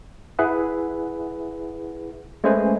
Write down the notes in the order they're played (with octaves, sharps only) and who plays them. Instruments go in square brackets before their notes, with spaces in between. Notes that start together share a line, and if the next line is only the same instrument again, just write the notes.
[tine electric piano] E4 G#4 B4 E5 F#5
G#3 A3 C#4 B4 C5 G#5